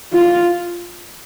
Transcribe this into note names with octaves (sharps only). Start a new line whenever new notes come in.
F4